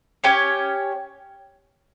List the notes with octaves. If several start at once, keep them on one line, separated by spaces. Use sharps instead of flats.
C#4 G4 C#5